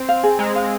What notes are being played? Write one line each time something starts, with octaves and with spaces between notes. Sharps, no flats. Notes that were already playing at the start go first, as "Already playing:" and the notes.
Already playing: C4
F5
G#4
G#3 A#5
F5